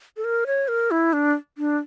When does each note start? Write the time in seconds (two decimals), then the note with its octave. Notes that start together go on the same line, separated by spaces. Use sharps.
0.17 A4
0.24 A#4
0.47 C#5
0.68 A#4
0.91 E4
1.13 D4
1.58 D4